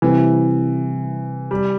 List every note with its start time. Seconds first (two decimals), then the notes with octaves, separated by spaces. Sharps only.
0.02 C3 E3 G3 C4 E4 G4
1.51 G3